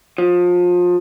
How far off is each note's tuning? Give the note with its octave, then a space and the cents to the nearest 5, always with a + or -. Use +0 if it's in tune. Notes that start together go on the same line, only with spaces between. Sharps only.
F3 +25